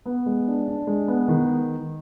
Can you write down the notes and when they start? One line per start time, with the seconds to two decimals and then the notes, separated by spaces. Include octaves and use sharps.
0.06 B3
0.26 G#3
0.48 D4
0.68 D4
0.87 G#3
1.08 B3
1.28 D#3